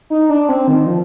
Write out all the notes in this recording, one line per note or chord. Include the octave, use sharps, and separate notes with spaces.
D#4
D4
C4
D#3
F3